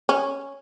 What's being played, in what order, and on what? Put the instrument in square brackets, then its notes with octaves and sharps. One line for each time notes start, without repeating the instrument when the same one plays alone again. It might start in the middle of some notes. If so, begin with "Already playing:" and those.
[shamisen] C#4